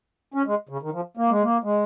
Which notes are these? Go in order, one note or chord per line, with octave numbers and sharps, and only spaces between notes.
C#4
G#3
C#3
D#3
F3
A#3
G#3
A#3
G#3